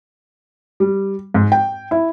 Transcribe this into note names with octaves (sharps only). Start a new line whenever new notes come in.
G3
G#2
G5
E4